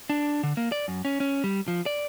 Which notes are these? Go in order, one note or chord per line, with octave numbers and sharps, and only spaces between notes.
D4
D3
A#3
D5
F#2
C#4
C#4
G3
F3
D5